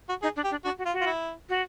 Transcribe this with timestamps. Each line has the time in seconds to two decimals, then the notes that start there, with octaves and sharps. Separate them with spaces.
0.09 F#4
0.22 D#4 G#4
0.36 D4
0.44 G4
0.51 D4
0.65 D4 F#4
0.78 F#4
0.86 F4
0.93 F#4
1.01 F4
1.06 E4
1.49 F#4